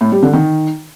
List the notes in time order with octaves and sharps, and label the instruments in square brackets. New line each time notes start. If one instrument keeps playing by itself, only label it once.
[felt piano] A2
G3
D3
D#3